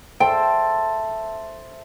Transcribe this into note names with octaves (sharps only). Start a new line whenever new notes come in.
A4 C5 E5 G5